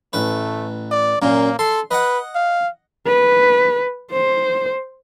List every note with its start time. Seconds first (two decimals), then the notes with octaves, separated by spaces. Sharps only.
0.13 A1 A3 B4
0.91 D5
1.22 F#2 A#2 A#3
1.59 A4 C6
1.91 B4 D#5 F#5
2.35 F5
3.07 B4
4.11 C5